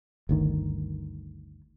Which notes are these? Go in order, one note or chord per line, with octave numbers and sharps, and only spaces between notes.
G1 D2 D#3